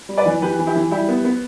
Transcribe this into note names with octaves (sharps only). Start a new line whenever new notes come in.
G3
B4 D5
E3
E3 G4 B4
E3
E4 G4
E3
G3 E4 G4
B3
B3